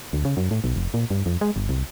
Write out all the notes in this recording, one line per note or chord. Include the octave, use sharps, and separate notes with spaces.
D2
C#3
F#2
A2
B1
F1
A#2
G2
F2
G#3
G1
C2